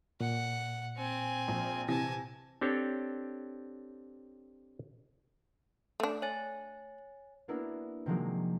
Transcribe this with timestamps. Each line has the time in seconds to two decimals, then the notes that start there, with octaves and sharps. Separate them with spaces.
0.20 A#2 F#5
0.97 C4 G#5
1.48 A#1
1.88 C3 E3 G#5 A5 A#6
2.61 C4 D4 G4 A4 C#5
6.00 A3 D4
6.22 C#5 G#5 A6
7.48 A#3 B3 D4 E4 F#4 A#4
8.06 C3 D#3 F3 F#3 G#3 A#3